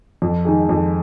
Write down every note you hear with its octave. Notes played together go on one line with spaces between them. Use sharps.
F2
D#3 G#3 D#4 G#4
F2